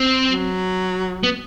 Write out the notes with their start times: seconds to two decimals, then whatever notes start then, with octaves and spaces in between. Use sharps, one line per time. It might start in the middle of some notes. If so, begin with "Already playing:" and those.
Already playing: C4
0.26 F#3
1.23 B3